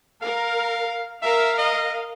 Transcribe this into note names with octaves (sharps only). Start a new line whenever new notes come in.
A#4 F5
A#4 E5 F5
D#5